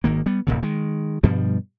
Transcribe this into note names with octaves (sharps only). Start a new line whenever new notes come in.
G#1 D#3 A#3
G3 B3
D#1 B1 A#2 C#3
D#3 G#3
G2 B2 F3 G3